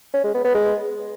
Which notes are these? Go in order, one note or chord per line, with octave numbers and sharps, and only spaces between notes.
C#4
G#3
B3
B3
G#3